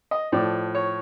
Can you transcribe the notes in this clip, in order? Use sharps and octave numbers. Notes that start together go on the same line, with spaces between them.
D#5
A2 F3 D5
C#5